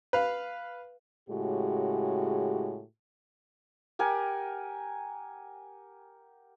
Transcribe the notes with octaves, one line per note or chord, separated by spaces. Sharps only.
B4 F5
A2 C#3 G#3 F#4 G4
G4 A#4 F#5 G#5